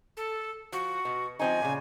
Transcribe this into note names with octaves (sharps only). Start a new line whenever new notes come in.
A4
F3 F#4
B2
F3 C4 D#4 G#5
A#2 C#3